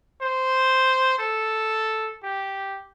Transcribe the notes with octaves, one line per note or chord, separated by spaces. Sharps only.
C5
A4
G4